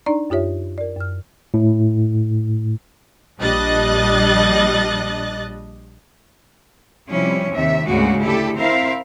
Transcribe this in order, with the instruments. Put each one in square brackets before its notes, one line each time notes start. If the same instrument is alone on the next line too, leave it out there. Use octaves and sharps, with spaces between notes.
[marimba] D4 D#4 D5 A#5
F#2 F4 G4 C#5 E5
A#4 D5
F#2 F6
[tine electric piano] A2
[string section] A#1 G3 D4 D#5 F#6 A6
[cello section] C3 F3 G3 C#4 E4
D#2 C3 D#3 E5
D2 G#2 C#3 G#3 A#3 F#4
D2 E4 G4 A4
C4 E4 A#4 C5 E5 F5